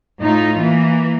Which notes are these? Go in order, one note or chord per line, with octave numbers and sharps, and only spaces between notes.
A2 D#4 F4
E3 A#3